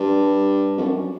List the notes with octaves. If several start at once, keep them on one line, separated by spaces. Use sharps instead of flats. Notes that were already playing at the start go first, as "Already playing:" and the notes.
Already playing: G2
F2
F#2